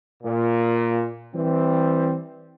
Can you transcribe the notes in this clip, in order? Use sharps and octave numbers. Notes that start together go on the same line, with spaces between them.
A#2
E3 G3 C4